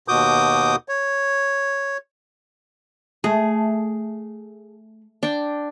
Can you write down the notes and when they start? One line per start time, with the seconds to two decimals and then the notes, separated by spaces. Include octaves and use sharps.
0.08 D#2 B2 F#4 D6 D#6 G6
0.89 C#5
3.24 A3 G#4
5.23 D4 G5